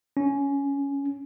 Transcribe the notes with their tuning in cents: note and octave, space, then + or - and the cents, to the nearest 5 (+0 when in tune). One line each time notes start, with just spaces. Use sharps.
C#4 +10